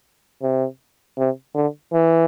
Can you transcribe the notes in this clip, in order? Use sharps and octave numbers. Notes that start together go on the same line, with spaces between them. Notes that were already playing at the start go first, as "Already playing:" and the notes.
C3
C3
D3
E3